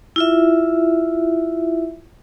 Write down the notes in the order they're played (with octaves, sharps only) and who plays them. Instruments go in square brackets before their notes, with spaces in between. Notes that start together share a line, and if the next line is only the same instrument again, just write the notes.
[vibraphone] E4 F4 E5